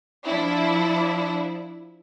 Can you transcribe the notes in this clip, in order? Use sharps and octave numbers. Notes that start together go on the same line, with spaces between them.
F3 D4 E4